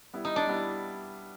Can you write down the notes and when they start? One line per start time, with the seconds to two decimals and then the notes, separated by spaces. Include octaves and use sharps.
0.13 G3 B3 E4
0.25 D#4
0.36 D4
0.47 G3 B3 E4